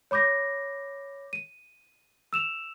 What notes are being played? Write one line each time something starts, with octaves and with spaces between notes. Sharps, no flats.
C#5 B5 D6 G6 A#6
D#7
E6 E7 F7